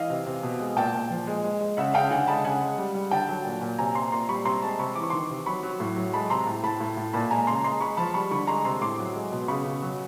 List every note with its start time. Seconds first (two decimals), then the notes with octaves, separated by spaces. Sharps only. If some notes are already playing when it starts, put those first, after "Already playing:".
Already playing: E3 D#5 F5
0.10 C3
0.27 C3
0.43 B2
0.60 G#3
0.76 A#2 G5 A5
0.94 A#2
1.11 F3
1.27 G#3
1.44 G#3
1.60 G#3
1.77 C#3 E5 F#5
1.94 C#3 F5 G5
2.10 D3 F#5 G#5
2.27 G#3 A5 B5
2.44 C#3 F#5 G#5
2.61 G#3
2.78 G3
2.95 G3
3.11 D3 G5 A5
3.28 F#3
3.45 A#2
3.61 A#2
3.78 C3 G#5 A#5
3.95 C3 A#5 C6
4.12 A#2 A#5 C6
4.29 G3 B5 C#6
4.45 C3 A#5 C6
4.62 G#3 A5 B5
4.79 C3 B5 C#6
4.96 E3 D6
5.03 C#6
5.10 D#3 C6 D6
5.30 C3
5.46 F#3 B5 C#6
5.63 F#3
5.80 A2
5.96 F#3
6.13 G#3 A5 B5
6.30 C3 A#5 C6
6.47 A2
6.63 A2 A5 B5
6.80 A2
6.97 A2
7.13 A#2 A5 B5
7.31 G#3 G#5 A#5
7.47 C#3 A#5 C6
7.64 G#3 A#5 C6
7.80 G#3 B5 C#6
7.97 F3 A5 B5
8.14 G3 B5 C#6
8.31 D3 B5 C#6
8.47 G#3 A#5 C6
8.65 C3 A#5 C6
8.81 A2 C6 D6
8.99 F#3
9.15 G#3
9.32 B2
9.48 C#3 B5 C#6
9.65 C#3
9.82 F#3